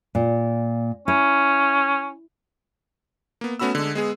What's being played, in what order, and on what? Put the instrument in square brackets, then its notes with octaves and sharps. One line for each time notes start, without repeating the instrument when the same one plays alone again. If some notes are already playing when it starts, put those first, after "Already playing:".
[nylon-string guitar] A#2
[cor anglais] C#4 [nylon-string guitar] E4
[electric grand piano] A#3 B3
A3 B3 C#4 F#4 B5 E6
D3 G#3
G#3 B3 G#4